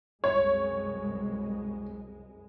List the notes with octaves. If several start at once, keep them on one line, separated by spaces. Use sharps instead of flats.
C2 F#2 G#3 C#5